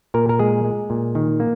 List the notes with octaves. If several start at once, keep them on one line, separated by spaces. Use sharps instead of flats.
A#2 A#4
A#4
G#3 G#4
G#3
A#2
D#3
A#3